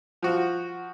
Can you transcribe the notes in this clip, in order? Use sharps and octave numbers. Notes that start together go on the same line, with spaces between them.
F3 F#4